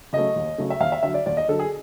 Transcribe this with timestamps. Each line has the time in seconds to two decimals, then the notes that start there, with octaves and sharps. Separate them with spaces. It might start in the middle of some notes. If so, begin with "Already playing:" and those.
0.13 C#3 F#3 A3 D#5
0.36 D#2
0.58 C#3 F#3 A3
0.70 E5
0.80 D#2 F5
0.92 E5
1.03 D3 F#3 E5
1.14 D5
1.26 D#2 D5
1.37 D#5
1.48 D3 F#3 A4
1.59 G#4